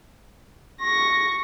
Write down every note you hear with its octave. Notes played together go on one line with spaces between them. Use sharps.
C#6 A#6